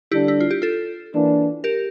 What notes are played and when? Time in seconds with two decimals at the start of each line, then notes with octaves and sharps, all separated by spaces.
0.12 D3 G3 D4 E4 G4
0.28 E4
0.41 F4
0.51 G4
0.62 F4 A4
1.13 E3 A#3 D4
1.64 G4 A#4